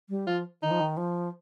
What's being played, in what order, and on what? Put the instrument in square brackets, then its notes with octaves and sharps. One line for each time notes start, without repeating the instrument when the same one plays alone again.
[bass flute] G3
[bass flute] F3 [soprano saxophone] F4
[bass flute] D#3 [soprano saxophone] D#4
[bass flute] F3
D#3
F3